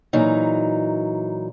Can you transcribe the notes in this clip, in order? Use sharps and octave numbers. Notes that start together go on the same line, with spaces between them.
A#2 E3 F#3 D#4